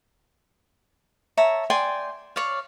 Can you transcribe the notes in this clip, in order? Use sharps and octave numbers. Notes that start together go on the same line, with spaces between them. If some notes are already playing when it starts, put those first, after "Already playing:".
C#5 E5 A5 A#5
D5 G5 G#5 C6
C#5 D5 F5